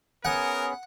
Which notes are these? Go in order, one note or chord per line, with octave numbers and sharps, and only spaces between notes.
B3 C#4 G#4 A#4 F#5 G#5